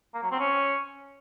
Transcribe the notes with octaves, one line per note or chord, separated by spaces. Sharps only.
A#3
F#3
C4
C#4